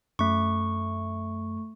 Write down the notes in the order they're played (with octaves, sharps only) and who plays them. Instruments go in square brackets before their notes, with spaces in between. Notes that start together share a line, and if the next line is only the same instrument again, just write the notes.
[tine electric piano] F#2 [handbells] A3 C#6